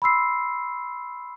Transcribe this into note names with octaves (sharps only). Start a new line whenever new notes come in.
B5 C6 E6 C7